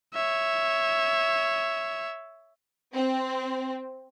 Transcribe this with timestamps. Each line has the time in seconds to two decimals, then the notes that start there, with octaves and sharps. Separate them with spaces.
0.14 C#5 E5
2.94 C4